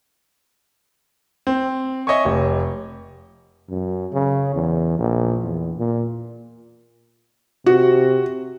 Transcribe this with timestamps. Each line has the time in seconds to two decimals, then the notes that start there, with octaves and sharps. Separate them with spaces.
1.47 C4
2.07 C#5 D#5 E5 G#5 C#6
2.25 F1 C#5
3.70 F#2
4.13 C#3
4.54 E2
4.98 A#1
5.43 E2
5.78 A#2
7.66 C3 F#4